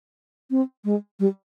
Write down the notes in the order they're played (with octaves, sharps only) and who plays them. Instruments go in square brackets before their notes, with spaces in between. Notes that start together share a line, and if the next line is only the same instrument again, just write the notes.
[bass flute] C4
G#3
G3